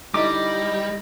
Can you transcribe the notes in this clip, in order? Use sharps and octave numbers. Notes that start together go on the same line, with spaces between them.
D3 G3 D#4 E4 D#5 D6